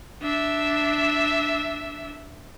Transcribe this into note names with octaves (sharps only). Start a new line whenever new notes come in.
D4 E5